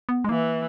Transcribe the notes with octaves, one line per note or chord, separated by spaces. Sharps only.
B3
G#3
E3 A#3